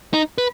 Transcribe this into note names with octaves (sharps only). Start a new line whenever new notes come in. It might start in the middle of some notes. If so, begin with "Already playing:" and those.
D#4
B4